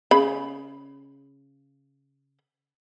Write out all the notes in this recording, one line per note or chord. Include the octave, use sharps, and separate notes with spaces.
C#3 B5